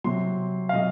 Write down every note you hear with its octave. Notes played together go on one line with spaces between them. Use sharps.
C3 F#3 C6
F5
C3 F#3 D#5